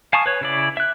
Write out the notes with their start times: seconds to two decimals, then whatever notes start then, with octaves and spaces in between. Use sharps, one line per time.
0.13 F5 G#5 A5 C#6 D#6
0.26 B4 C#5
0.41 C#3 E4 D5
0.77 E5 F#6